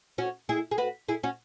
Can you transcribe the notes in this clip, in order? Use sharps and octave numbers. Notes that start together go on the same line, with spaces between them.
C#4 F#4
E4 G#4
G#4
F#4 B4
E4 G#4
C#4 F#4